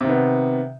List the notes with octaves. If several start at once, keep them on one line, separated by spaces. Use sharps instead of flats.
C3 D#3 B3